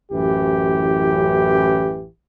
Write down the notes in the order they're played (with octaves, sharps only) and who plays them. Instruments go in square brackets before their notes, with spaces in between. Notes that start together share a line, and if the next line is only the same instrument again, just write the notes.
[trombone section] A1 F#2 E3 G4